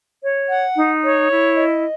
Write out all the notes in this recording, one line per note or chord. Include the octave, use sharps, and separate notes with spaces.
C#5
F#5
D#4
C#5
E4
D#5